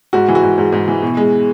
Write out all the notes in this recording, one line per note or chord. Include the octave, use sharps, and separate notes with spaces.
G#2 F#4
E3
F#4
G#2
G#2
G#2
E3
B2
G#3